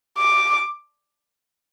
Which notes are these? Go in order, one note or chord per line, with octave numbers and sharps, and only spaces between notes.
D6